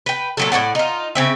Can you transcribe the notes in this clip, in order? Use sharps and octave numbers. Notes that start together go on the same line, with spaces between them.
B4 G5
A#2 F#3 A4
A2 C4 D5 F#5
D#4 F4
C#3 C4 E5